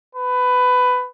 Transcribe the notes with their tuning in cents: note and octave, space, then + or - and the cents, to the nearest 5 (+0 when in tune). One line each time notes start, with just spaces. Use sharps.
B4 +15